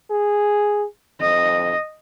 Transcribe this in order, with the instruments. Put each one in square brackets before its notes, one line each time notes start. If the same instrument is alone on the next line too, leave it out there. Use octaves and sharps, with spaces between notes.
[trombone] G#4
[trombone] F2 [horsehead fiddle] D#5